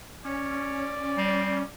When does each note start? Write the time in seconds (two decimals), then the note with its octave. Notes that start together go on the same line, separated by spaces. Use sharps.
0.25 C#4 C#5 D5
1.17 G3 C4